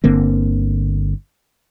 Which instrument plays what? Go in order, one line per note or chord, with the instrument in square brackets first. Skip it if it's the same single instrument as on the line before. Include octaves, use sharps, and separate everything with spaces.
[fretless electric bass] G1 D3 A#3 C4